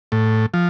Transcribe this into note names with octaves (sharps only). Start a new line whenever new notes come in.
A2
F3